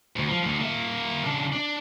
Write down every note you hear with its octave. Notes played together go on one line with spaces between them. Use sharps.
D2
F3
D2 D3
A#3 E5
C#3 D4
D4